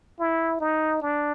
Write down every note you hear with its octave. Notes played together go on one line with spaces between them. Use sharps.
E4
D#4
D4